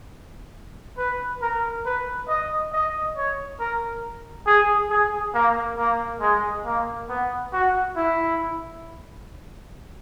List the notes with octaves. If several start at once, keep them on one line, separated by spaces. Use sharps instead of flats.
B4
A#4
B4
D#5
D#5
C#5
A#4
G#4
G#4
A#3
A#3
G#3
A#3
B3
F#4
E4